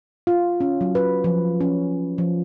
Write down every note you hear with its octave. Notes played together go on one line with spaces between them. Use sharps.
F4
C#4
F#3
B4
F3
C#4
F3